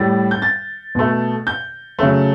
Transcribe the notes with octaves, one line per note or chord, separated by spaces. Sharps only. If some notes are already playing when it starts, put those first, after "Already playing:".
Already playing: A2 G3 A6
G6
A6
B2 A3
G6
C#3 F#3 A3